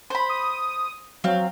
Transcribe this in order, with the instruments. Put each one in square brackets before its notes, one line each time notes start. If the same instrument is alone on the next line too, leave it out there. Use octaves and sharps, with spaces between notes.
[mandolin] C5 B5
[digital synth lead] D#6
[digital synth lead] F#3 [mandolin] C4 F5